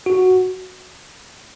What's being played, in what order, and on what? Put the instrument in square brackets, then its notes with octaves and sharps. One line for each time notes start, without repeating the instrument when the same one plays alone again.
[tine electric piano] F#4